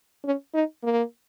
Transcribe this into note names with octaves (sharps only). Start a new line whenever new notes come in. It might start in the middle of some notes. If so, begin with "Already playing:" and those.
C#4
D#4
A#3